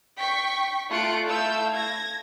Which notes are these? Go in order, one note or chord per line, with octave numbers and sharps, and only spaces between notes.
G5 C#6 B6
A3 F4 F#6 C#7 D7
A3 E4 F5 E6 G6
G#6 A#6